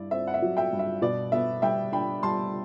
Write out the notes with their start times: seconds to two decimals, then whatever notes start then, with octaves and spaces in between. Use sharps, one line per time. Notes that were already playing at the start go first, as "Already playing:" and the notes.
Already playing: G2 E4 D5
0.11 C4 E5
0.27 F#5
0.34 E5
0.42 F#3
0.57 E5 G5
0.73 G2
0.79 E5
1.02 B2 D5
1.32 B3 E5
1.62 G3 E5 G5
1.92 D4 G5 B5
2.23 G3 A5 C6